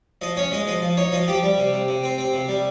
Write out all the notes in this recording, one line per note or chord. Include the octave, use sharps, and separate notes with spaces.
F3 D#5
C#4 C#5
G#3 D#5
F3 D#5
F3
D#4 C#5
F3 D#5
F3 G4
G3
C3
C3
C3
C4
C4
C3
G3